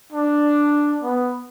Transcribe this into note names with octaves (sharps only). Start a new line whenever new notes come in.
D4
B3